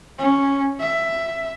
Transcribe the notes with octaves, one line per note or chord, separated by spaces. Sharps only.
C#4
E5